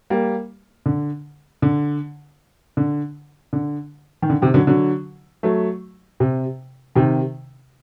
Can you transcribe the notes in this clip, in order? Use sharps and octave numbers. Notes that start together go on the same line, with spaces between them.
G3 A#3
D3
D3
D3
D3
D#3
D3
C3 D#3
D3 F#3
D3 F#3
F#3 A3
C3
C3 D#3